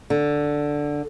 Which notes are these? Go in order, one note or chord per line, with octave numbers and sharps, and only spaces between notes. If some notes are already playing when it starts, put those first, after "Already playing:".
D3